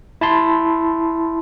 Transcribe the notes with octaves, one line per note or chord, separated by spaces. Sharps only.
E4 A5 C6